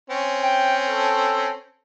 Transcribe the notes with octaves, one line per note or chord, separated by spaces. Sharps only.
C4 C#4
G5
A4